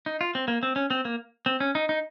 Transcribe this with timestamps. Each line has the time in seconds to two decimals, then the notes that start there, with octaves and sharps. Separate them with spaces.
0.06 D#4
0.21 F4
0.35 C4
0.48 A#3
0.63 C4
0.76 C#4
0.90 C4
1.05 A#3
1.46 C4
1.60 C#4
1.75 D#4
1.89 D#4